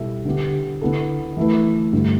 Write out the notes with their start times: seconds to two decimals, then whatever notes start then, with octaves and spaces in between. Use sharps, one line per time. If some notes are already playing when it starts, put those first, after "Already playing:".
Already playing: B2 G3 E4 A4 E5
0.25 D3 B3 G4
0.81 D3 B3 E4 A4
1.37 E3 A3 E4 B4
1.93 G2 D3 A3